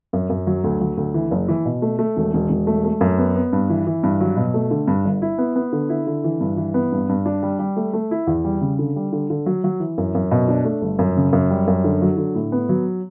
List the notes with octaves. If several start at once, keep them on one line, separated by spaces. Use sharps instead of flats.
F#2
F#2
F#3
D2
F#3
D2
E3
F#1
E3
B2
A3
A3
E1
E1
E1
A3
A3
F#2
B3
B3
G2
E3
E3
G2
F#3
B2
A3
D3
G2
G1
E4
B3
B3
D3
E4
D3
E3
G2
E3
B3
G2
G2
D4
G3
G3
A3
A3
E4
E2
G3
C#3
D3
G3
D3
D3
F#3
F#3
E3
F#2
F#2
B2
D4
A3
G1
F#2
C#3
F#2
G3
F#2
D3
F#3
D3
A2
B3
F#3